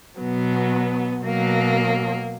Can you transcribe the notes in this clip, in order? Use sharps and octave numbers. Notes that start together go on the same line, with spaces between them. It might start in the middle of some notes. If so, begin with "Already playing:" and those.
B2 F#3 B3
B2 F#3 A#3